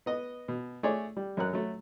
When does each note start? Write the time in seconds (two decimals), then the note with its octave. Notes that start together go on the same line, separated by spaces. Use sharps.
0.06 B3 D#5
0.48 B2
0.83 A3 G#4 C#5 D5
1.17 G3
1.37 F#2 C#4 A#4 F#6
1.53 F#3 A3